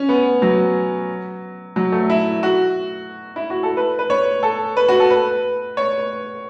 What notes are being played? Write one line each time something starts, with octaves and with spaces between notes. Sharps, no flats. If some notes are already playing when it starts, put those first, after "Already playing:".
Already playing: C#4
B3
F#3
F#3
A3
E4
F#4
E4
F#4
A4
B4
B4
C#5
A4
B4
F#4
A4
B4
C#5